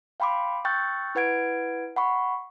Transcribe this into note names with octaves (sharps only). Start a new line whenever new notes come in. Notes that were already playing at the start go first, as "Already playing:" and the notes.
F5 G5 B5 C6 D6
G5 C#6 E6 F#6 G6 A6
E4 B4 F#5 G#6 D7
F#5 B5 C#6